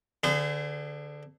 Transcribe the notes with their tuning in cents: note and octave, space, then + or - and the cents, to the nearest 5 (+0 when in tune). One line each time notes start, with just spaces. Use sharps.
D3 +0 G#4 -20 C5 -45